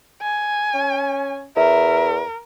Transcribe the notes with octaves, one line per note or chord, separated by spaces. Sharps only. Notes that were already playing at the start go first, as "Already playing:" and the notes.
G#5
C#4
E2 A#4 E5